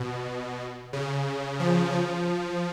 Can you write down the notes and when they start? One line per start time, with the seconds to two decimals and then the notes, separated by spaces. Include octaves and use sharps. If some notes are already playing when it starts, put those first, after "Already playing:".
Already playing: B2
0.93 C#3
1.60 F3
1.93 F3